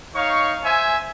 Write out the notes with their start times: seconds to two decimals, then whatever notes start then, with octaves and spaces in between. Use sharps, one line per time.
0.15 D#4 C#5 F5 C#6
0.64 C5 E5 G#5